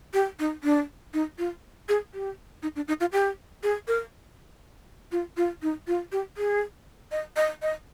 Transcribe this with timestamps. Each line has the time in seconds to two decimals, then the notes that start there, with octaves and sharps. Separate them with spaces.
0.14 G4
0.40 D#4
0.64 D4
1.14 D#4
1.38 F4
1.89 G#4
2.14 G4
2.63 D#4
2.76 D4
2.88 D#4
3.00 F4
3.12 G4
3.63 G#4
3.88 A#4
5.12 F4
5.37 F4
5.62 D#4
5.87 F4
6.12 G4
6.37 G#4
7.11 D#5
7.36 D#5
7.62 D#5